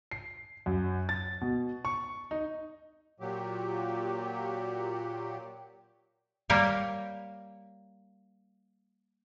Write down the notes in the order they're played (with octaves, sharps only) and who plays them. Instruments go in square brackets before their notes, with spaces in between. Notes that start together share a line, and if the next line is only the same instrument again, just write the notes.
[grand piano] C7
F#2
A6
B2
C#6
D#4
[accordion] A#2 F#3 G4
[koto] G3 A#3 G4 C#5